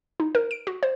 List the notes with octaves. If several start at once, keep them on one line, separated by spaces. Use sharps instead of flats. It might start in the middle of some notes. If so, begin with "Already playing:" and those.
D#4
A#4
D7
F#4
C5